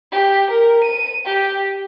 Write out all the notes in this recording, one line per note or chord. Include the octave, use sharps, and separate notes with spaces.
G4
A#4
D#7
G4